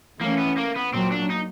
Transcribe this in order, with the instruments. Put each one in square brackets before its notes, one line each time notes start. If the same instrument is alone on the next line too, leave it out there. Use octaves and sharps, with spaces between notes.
[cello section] E3 A3 C#4 [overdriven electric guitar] A#3
[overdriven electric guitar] B3
A#3
B3
[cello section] A#2 F#3 A#3 [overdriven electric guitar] C4
[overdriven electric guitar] D4
D#4